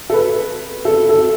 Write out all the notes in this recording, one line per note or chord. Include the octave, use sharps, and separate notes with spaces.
A4
B4
A4
A4